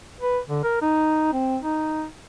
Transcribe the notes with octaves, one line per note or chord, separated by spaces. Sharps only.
B4
D3
A#4
D#4
C4
D#4